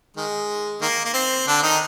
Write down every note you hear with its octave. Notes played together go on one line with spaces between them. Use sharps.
D#3 G#3
D#3 A#3
A#3
C4
D3 D4
D#3 D#4